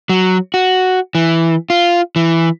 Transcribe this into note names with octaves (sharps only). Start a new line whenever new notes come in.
F#3
F#4
E3
F4
E3